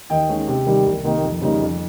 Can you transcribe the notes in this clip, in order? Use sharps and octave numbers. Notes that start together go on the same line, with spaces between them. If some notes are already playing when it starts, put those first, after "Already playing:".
D#2 D#5 G5
D#3 G#3 C#4
C3
D#3 G3
C2
C3 D#3 A#3 D#4
F2
C#3 G3 A#3 D#4
F2